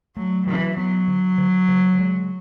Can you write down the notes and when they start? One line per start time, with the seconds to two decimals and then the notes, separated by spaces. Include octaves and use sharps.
0.16 F#3 A3
0.47 E3 F#3
0.77 F#3 B3
1.08 D3
1.38 D3
1.68 C#3
1.99 G#3